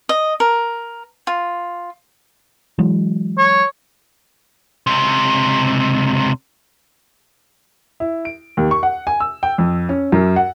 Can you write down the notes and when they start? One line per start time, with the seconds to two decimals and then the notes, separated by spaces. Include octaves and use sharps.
0.09 D#5
0.40 A#4
1.27 F4
2.78 E3 F#3 G#3
3.38 C#5
4.87 C#2 C3
8.00 E4
8.25 D7
8.57 D#2
8.71 C#6
8.83 F#5
9.07 G#5
9.20 E6
9.43 G5
9.58 F2
9.89 C#4
10.12 F#2
10.36 F#5